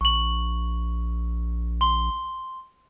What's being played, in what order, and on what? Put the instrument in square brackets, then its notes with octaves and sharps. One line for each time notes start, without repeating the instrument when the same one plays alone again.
[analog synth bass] A#1 [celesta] C#6 F#7
[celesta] C6 G7